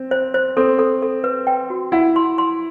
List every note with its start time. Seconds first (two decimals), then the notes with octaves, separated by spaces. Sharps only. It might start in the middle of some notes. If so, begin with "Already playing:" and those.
Already playing: C4
0.11 C5
0.34 C5
0.57 C4 A4
0.79 A4
1.02 A4
1.24 B4
1.47 G5
1.70 F#4
1.92 E4 F#5
2.16 C6
2.38 C6